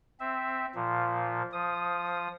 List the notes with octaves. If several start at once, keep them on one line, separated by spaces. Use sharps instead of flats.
C4 E5
A#2 F3
F3 D#6